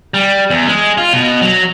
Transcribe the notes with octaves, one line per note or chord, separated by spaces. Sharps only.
G3
E2
G#3
F4
B2
F#3